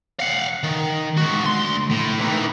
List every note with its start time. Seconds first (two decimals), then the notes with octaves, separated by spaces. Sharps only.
0.20 F5 F#5
0.63 D#3
1.17 G#3 F#4
1.43 D2 C6
1.91 A2
2.19 D#3 E3